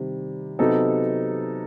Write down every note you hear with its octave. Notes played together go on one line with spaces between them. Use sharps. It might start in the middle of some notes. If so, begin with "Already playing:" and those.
Already playing: C3 D#3 G3
C3 F#3 B3 D#4 A4